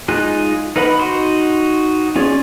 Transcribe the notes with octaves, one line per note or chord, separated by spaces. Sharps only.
G#3 D#4 F4 G#5 F#6
D#4 A#4 B4 F#5 B5
D#4 F#4 C6
C#4 F4 G#4 C#5 D5